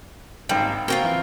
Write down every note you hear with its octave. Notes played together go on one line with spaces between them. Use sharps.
G#1 G3 A#3 G5
A#3 C4 F4 F#4 A#4 G5
E3